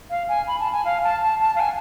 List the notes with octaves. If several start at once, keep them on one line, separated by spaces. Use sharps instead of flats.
F5
G#5
B5
A5
G#5
F5
A5
A5
A5
F5
G#5